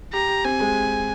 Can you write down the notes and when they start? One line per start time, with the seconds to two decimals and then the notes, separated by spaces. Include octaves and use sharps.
0.13 G4 A#5
0.29 G4
0.44 C4 G#5
0.60 G#3